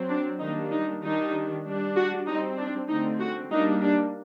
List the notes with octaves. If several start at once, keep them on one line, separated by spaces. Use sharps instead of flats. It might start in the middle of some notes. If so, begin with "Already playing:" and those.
Already playing: F#3 C4
D4
D#3 G3 A#3 D4 D#4
D#4
D#3 G3 D4 D#4
G3 D4
F#4
G3 C4 D#4
D4
D3 A3 C4 D#4
F#4
G3 A#3 D4 D#4
D4